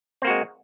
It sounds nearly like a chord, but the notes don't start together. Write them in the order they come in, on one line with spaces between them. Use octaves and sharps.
C4 A#3 F#4 G#3